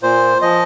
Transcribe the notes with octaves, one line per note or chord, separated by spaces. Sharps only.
A#2 C5
F3 D#5